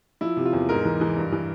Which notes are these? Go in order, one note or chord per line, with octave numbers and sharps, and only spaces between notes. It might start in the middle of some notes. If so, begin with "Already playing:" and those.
F3 E4
C3
F4
E2
G#2 A#4
E3
E3
G2
E3